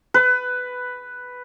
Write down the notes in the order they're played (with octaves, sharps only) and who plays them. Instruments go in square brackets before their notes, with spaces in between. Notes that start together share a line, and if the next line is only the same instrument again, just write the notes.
[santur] B4